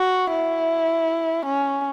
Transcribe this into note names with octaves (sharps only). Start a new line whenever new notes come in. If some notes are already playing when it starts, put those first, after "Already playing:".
Already playing: F#4
E4
C#4